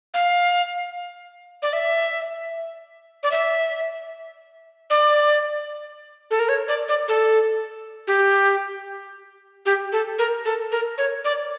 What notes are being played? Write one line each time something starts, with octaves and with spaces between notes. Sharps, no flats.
F5
D5
E5
D5
E5
D5
A4
A#4
C#5
D5
D5
A4
G4
G4
A4
A#4
A4
A#4
C#5
D5